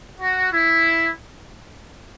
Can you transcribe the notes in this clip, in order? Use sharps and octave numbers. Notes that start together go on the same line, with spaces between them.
F#4
E4